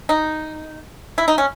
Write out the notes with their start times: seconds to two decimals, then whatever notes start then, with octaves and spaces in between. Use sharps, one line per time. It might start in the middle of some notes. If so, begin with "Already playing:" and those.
0.09 D#4
1.18 E4
1.28 D#4
1.38 C#4